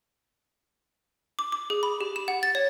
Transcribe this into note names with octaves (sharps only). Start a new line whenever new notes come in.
D6
D6
G#4
B5
G4
E7
F#5
A6
C#5